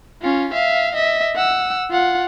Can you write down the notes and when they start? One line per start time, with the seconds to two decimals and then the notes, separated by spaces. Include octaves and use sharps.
0.22 C#4 F4
0.53 E5 F5
0.95 D#5 E5
1.35 F#5 E6
1.91 F4 F#5